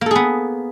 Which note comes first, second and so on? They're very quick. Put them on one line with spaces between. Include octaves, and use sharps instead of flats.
A#3 A4 G#4 B3